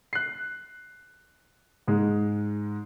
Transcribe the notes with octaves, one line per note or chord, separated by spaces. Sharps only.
F#6 C7
G#2 G#3